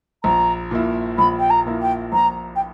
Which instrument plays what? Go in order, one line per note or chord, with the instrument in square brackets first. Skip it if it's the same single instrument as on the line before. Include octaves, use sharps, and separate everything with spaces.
[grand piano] A#1 [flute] A#5
[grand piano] A#2 A#3 E4
[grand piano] A#1 [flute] B5
[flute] G5
A#5
[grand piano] A#2 A#3 E4
[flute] G5
[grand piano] A#1 [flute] A#5
[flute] G5